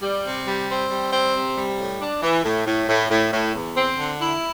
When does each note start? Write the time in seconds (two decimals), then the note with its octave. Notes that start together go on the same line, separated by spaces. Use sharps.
0.02 G3
0.25 C3
0.47 G3
0.69 C4
0.90 G3
1.12 C4
1.34 C3
1.56 G3
1.78 A2
2.00 D4
2.22 E3
2.43 A2
2.66 A2
2.88 A2
3.09 A2
3.32 A2
3.53 E2
3.76 C4
3.97 D3
4.20 E4